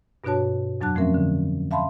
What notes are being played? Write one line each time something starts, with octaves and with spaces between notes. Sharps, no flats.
G2 B2 D4 F#4 C#5 A5
F2 F#3 D4 A5 F#6
F3 A3 C4 C#4 A#4 E5
D3
E5 F5 A5 B5 C6